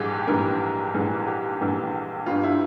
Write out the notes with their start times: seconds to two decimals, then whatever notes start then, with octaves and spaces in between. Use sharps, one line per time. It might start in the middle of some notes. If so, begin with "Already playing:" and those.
Already playing: A#1 G#2 E3 G3 G4 G#4
0.27 A#1 G#2 E3 G3 A#4
0.94 A#1 G#2 E3 G3 G#4
1.27 G4
1.61 A#1 G#2 E3 G3
2.26 G1 G2 G3 F4
2.43 E4